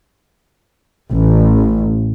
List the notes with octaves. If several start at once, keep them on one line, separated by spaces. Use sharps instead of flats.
A1